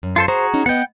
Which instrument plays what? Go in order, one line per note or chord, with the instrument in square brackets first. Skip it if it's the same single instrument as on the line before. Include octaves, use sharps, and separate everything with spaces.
[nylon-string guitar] F#2
[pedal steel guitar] F4 A4 C5
[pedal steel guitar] F#4 G#4 A#5 [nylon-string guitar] C5
[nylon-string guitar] C#4 D#4
[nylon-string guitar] B3 B4 D#5 [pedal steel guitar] F#5 G5